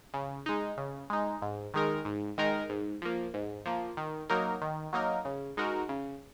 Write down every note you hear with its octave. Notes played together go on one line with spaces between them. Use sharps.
C#3
G#3 D#4
C#3
G#3 D#4
G#2
D#3 G#3 D#4 A#4
G#2
D#3 G#3 D#4 A#4
G#2
F3 A#3
G#2
F3 A#3
D#3
F#3 A#3 D#4 A#4
D#3
F#3 A#3 D#4 A#4
C#3
G#3 D#4 F#4 A#4
C#3